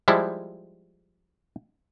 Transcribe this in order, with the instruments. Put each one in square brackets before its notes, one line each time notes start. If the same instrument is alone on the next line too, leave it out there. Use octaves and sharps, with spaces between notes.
[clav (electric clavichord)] F3 G3 G#3 E4